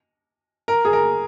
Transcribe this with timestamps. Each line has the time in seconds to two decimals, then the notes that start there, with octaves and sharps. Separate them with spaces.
0.68 A#4
0.85 G#4
0.93 A#4